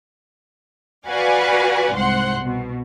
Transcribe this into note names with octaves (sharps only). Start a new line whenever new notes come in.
F#4 B4 D5 F5 F#5 G#5
C2 G#2 C5 F#5 C6
B2